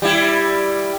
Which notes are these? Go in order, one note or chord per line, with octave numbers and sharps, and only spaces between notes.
G3 E4